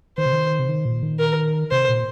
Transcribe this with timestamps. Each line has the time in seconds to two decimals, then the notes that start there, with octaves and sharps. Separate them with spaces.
0.18 D#3 C5
0.25 C3
0.33 D#3
0.59 C3
0.69 D#3
0.85 A#2
1.03 D#3
1.19 A#4
1.71 C3 C5
1.89 A#2